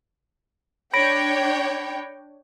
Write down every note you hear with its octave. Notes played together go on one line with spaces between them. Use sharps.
D4 C#5 G5 B5 A#6 D7